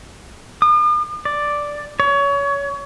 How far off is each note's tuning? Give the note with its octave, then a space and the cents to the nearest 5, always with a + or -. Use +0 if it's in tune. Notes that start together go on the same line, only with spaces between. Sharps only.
D#6 -45
D5 +0
C#5 +25